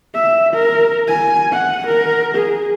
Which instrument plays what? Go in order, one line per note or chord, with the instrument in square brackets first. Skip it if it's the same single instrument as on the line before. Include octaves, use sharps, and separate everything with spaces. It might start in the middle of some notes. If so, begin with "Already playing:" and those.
[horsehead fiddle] E5
A#4
G#5
F#5
A#4
G#4